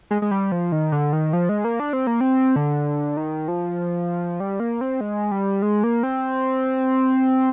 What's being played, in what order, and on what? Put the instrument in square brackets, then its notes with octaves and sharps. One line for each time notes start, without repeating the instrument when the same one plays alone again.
[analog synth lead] G#3
G#3
G3
F3
D#3
D3
D#3
F3
G#3
A#3
D4
C4
A#3
C4
D3
D#3
F3
G3
A#3
C4
G#3
G3
G#3
A#3
C4